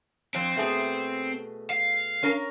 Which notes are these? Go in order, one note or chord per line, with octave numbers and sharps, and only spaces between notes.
F2 C4
B2 A3 G#4
F5
C#4 A#4 A#5